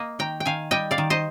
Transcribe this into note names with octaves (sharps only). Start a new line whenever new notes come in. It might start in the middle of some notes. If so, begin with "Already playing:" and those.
Already playing: A#3 D#5
D#3 G5 A#5
G5
D#3 F5 G#5
G3 D#5 G5
D5 F5
D#3
C5 D#5